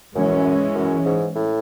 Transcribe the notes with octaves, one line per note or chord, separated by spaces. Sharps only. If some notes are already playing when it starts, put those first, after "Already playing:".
F#2 E3 G#3 C#4
F#2
G#2
A2